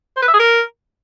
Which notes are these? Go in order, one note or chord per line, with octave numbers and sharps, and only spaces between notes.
C5
B4
E5
G#4
A#4